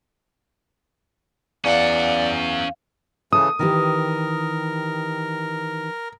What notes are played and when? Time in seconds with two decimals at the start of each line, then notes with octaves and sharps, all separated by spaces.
1.65 E2 C#4 D5 F5 F#5
3.33 C#3 E3 A4 D#6
3.59 D#3 E3 G4 A#4